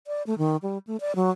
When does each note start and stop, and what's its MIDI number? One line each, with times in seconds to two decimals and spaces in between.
0.07 0.23 74
0.27 0.37 57
0.38 0.57 51
0.62 0.78 55
0.87 0.97 57
1.01 1.15 74
1.16 1.30 54